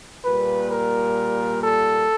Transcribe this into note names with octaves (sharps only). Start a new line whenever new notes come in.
A#2 G3 A#3 B4
A#4
A4